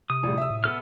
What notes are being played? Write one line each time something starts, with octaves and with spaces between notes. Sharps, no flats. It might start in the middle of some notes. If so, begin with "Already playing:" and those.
C3 D#6
A#1 A2 G3
E5 E6
A2
B3 A4 F6